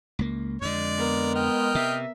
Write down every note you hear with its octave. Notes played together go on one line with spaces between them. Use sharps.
C#2 A#3
F2 D3 G#3 D5
B3 A#4
D#5 G5 F6
C3 E5